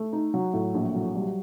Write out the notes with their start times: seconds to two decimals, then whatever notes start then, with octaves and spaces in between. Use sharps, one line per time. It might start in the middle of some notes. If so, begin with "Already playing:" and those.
Already playing: A3
0.13 D#4
0.34 F#3
0.53 A2
0.75 A#1
0.94 F#3
1.15 G3